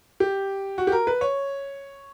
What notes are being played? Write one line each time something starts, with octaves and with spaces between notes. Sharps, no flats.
G4
F#4
G4
A#4
B4
C#5